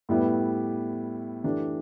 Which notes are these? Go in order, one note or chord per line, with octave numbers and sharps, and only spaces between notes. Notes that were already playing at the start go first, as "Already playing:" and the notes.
A2 G3 B3 E4 G4
E3 A3 D4 G4